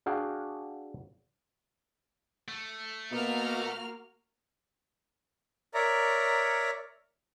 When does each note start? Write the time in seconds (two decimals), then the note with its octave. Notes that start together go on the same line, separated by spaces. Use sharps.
0.06 D4 F#4 G#4 F5 G5
2.48 A3
3.11 B2 A#3 F#4 F6
5.74 A#4 C#5 D5 E5 A#5